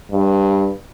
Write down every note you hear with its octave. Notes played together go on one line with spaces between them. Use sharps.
G2